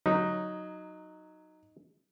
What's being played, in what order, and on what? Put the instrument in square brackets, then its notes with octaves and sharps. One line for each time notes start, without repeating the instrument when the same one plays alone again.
[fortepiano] F#3 [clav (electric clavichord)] D#4